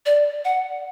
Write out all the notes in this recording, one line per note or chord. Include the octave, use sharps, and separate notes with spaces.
D5
F#5